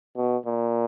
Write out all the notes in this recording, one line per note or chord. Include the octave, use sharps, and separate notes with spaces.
B2
A#2